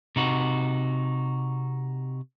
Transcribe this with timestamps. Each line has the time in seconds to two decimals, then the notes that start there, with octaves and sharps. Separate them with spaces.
0.16 C3 D#4 F#4